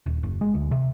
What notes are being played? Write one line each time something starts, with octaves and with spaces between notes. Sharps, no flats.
D#1
F#1
G#3
D2
C3